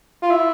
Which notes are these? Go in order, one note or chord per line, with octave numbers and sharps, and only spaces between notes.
F4
E4